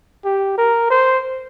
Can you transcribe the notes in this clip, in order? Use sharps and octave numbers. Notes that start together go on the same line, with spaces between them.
G4
A#4
C5